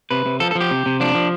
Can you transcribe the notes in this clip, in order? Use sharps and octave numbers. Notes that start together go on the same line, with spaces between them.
C3 B4
C3
F3 A4
A4
F3
G4
C3
C3
F3 D4
F3